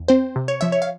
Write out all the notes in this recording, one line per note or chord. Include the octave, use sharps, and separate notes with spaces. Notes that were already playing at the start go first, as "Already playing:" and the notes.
Already playing: E2
C4 C5
C3
C#5
F3 E5
C#5
F5